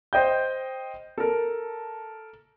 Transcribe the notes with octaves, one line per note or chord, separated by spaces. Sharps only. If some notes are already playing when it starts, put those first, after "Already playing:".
C5 D#5 G5 G6
A4 A#4